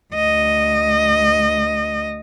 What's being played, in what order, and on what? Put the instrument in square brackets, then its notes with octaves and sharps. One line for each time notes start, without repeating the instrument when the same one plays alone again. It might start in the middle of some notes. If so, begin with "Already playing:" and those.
[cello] D2 D#5